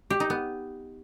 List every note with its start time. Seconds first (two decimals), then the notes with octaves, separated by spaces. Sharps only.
0.10 G4
0.20 D#4
0.30 B3